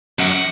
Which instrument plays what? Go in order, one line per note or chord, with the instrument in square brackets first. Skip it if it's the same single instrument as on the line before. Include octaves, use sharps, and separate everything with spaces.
[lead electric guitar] F#2 [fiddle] F#5